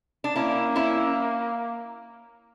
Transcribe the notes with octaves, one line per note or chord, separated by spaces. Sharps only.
D4
A#3 C#4 E4
C#4 E4